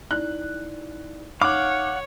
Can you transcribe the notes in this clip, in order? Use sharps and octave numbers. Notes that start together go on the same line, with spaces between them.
D#4 E4 D5 F#6
D#4 C#5 F5 F#5 D6